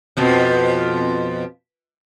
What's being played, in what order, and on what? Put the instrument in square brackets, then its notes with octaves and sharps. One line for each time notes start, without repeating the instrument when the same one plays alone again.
[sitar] F2 B2 F3